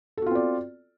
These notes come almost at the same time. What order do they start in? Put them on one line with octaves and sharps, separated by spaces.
A4 F#4 F4 C4 D5